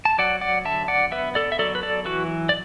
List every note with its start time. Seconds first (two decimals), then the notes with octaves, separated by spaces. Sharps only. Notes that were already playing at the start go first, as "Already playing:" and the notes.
0.05 A5
0.18 F#3 D5 F#5
0.41 D5 F#5
0.65 D3 E5 A5
0.88 D5 F#5
1.12 B3 B4 E5
1.35 A4 D5
1.52 E5
1.59 F#3 A4 D5
1.75 B4
1.83 A4 D5
2.05 E3 F#4 B4
2.49 D5